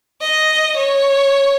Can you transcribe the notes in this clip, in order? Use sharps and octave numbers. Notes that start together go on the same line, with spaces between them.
D#5
C#5